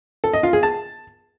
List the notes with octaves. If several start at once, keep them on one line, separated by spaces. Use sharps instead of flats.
A4
D#5
F4
G#4
A5